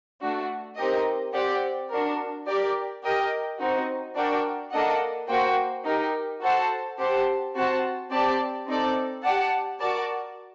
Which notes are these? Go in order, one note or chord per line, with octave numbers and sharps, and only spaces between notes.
A3 D4 F#4
C4 D#4 G4 A#4 D#5
C4 G4 D5 F#5
D4 F#4 A#4
G4 A#4 D5
G4 A#4 D#5 G5
C4 D#4 F#4
D4 F#4 A#4 D5 G5
A#3 D4 A4 D#5 F#5
A#3 F#4 C5 G5
D#4 G4 A#4
F#4 A4 C5 F#5 A5
C4 G4 C5 F#5 A5
C4 F#4 C5 F#5 A5
C4 G4 D5 A5
C4 D#4 A4 D5
G4 D5 F#5 A5
F#4 A#4 D5 A5